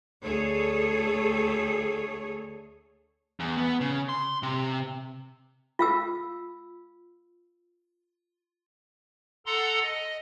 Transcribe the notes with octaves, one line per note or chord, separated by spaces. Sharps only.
D2 G#4 A4 C#5
E2
B3
C#3
C6
C3
F4 F5 E6
A4 F#5 A#5 C6
D#5